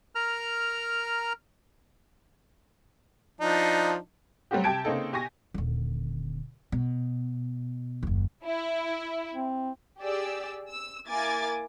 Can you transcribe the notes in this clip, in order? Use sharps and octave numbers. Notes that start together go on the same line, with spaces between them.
A#4 A#5 F6
F3 D4 D#4
F#3 G3 A3 C4 F#4 G4
C3 G4 G5 A5 G#6 D7
C#3 A#3 C4 D#4 A4
B2 G4 G#5 C#6 A#6
D#1 D3
B2
F#1 D#2
E4
C4
G4 G#4 D5 E6
E6
A#3 E4 G#5 D6 G#6 A6